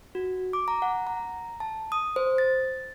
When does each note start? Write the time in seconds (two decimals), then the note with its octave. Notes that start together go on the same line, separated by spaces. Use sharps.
0.15 F#4
0.53 D6
0.68 A#5
0.82 F#5
1.07 A#5
1.60 A5
1.92 D#6
2.16 C5
2.38 A6